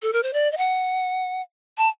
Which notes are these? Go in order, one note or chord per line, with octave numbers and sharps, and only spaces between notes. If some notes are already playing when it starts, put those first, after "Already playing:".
A4
A#4
C5
D5
D#5
F#5
A5